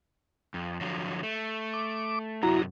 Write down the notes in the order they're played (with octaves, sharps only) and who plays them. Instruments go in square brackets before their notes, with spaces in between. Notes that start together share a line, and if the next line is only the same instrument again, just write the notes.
[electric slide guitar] F2
D3 F3 F#3
A3
[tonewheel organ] D6
[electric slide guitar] F#2 C3 F#3 [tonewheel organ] E4 F#4 A#5